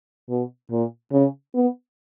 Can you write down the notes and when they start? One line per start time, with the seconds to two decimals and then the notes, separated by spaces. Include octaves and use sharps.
0.29 B2
0.71 A#2
1.12 C#3
1.54 B3